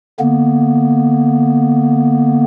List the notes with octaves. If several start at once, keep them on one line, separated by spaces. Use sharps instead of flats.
D3 A#3 B3